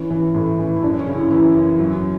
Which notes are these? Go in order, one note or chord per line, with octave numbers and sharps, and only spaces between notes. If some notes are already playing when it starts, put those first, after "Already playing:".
Already playing: E3 C#4
E3
A2
E3
E4
F#2 D4
C#4
C#3
E4
E3 E4
F#2
F#3